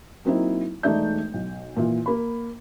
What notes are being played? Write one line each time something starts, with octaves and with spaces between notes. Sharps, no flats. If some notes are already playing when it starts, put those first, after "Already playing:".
F#3 A#3 C4 D#4 E4
E1 A3 D#4 D5 E5 G6
B1
A#2 E3 F4
A#3 B5